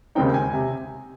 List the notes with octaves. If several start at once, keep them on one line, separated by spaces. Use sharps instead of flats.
D#2 C#3 G#3 C4 D#4 G5
G#5
C3